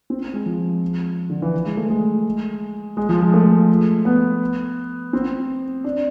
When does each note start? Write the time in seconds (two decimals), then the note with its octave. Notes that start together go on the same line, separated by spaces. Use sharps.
0.10 C4
0.33 G#3
0.46 F3
1.30 D3
1.42 E3
1.66 G#3
1.77 A3
1.90 G#3
2.97 G#3
3.09 F3
3.21 G#3
3.34 A3
4.05 B3
5.13 C4
5.84 D4